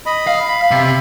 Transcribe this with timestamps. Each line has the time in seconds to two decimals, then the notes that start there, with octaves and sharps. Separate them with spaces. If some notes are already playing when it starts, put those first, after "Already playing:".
0.06 D#5 B5
0.27 F5
0.48 B5
0.71 C3